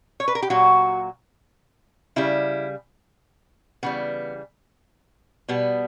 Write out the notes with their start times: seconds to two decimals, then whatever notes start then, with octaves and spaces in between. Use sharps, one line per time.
0.20 C#5
0.28 B4
0.35 A#4
0.42 G4
0.50 A#2 F#3 F#4
2.16 C#3 G3 E4
3.83 C#3 E3 G3 B3
5.48 B2 G3 B3